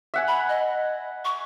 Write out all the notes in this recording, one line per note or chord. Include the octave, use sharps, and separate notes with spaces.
E5 F#5 G#5
B5
D#5
C#6